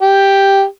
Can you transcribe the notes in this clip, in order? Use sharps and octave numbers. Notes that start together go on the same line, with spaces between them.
G4